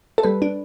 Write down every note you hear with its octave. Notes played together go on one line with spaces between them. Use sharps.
A4
G3 B4
D4